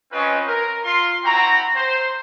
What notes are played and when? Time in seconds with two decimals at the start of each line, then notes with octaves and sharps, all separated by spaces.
0.12 C4 C#4 F4 B4 D#5
0.47 A#4
0.84 F4 C6
1.24 C4 E4 F#4 G5 A#5
1.76 C5